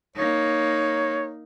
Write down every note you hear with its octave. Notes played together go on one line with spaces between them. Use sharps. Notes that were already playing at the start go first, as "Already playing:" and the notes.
A#3 D#4 C#5